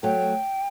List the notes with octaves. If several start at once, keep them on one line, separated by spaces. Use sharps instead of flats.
F#3 A3 G5